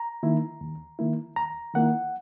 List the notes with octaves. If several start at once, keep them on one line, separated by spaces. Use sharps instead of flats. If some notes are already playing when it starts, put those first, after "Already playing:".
Already playing: A#5
D#3 A#3 E4
D#2
D#3 A#3 E4
D#2 A#5
D#3 A#3 E4 F#5